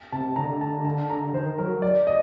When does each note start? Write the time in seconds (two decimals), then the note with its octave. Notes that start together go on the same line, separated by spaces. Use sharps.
0.12 C3 A5
0.36 D3 A#5
0.61 A5
0.85 A5
1.10 A#5
1.33 D#3 C5
1.58 F#3 A#4
1.82 D5
2.07 D#5